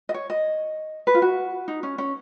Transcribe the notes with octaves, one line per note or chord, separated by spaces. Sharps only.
D#5
C#5
D#5
B4
F4
F#4
D#4
C#4
C#4